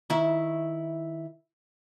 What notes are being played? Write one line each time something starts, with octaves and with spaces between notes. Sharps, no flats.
D#3 E4 E5